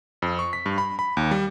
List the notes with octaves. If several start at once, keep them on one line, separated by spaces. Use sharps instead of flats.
F2
C#6
B6
G2
B5
B5
D#2
G3